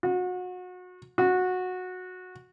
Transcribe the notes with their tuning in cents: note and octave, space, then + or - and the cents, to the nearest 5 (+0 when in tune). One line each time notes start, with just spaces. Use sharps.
F#4 -30
F#4 -15